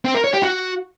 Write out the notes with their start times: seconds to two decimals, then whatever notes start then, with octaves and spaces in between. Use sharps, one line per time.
0.05 C4
0.14 A#4
0.24 C#5
0.33 G4
0.43 F#4